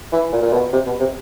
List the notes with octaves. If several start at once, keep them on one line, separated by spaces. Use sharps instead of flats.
E3
A#2
A#2
B2
C3
B2
C3